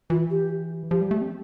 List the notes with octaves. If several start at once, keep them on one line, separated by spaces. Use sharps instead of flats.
E3 F4
G4
F3 G4
G3
A3
C4